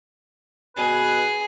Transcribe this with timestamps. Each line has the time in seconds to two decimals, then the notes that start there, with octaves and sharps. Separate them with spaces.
0.76 B2 G#4 B4